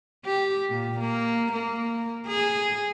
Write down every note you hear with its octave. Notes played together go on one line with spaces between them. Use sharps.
G4
A#2
A#3
A#3
G#4